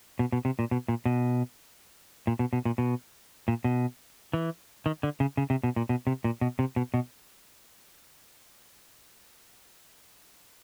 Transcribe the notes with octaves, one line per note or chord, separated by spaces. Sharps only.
B2
B2
C3
A#2
B2
A#2
B2
A#2
B2
B2
A#2
B2
A#2
B2
E3
D#3
D3
C#3
C#3
C3
B2
A#2
B2
C3
A#2
B2
C3
B2
B2